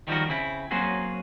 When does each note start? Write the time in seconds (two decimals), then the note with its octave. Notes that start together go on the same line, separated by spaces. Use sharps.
0.08 D#3 F3 G3 D4 F#4 A#4
0.29 C#3 C4 E4
0.71 F#3 A#3 C4 C#4 F#4 G#4